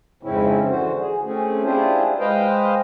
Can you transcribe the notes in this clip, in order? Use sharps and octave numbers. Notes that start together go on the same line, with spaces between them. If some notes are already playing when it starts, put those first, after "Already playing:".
F2 G#2 C#3 C4 C#4 E4
D3 E3 F#4 C5
G#4
A3 C4 C#4 G#4
D4 E4 F4 G4 G#4 C5
G#3 B4 C5 D#5 F5 G5